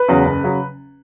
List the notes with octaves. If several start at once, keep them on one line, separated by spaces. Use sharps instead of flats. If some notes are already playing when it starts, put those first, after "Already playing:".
Already playing: B4
E2 C#3 F#3
F#1
C#3 F#3